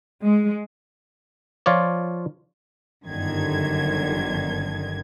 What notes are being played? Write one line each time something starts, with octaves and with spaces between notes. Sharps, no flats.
G#3
F3 F4 C#5 D5
G1 F#2 D3 D#3 G#6